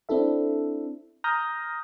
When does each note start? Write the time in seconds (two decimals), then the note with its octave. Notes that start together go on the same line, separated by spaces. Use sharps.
0.09 C4 D4 E4 A4 E5
1.24 A#5 D#6 F6 G6 A#6